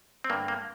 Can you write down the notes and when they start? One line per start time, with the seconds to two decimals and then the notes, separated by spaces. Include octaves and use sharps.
0.24 C4
0.30 G2 D3 A#3
0.48 A#3